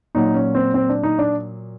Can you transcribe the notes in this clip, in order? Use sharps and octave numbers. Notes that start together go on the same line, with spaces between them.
A#2 F#3 D#4
C#4
C4
C4
D4
D#4
D4